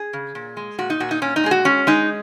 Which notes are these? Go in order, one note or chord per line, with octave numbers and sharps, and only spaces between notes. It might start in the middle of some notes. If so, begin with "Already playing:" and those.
Already playing: G#4
C#3
A#2
G#3
A#2 F#4
D#4
A#2 F#4
D#4
A#2 C#4
D#4
G#3 G#4
F#4
G#3 C#4
G#3 D#4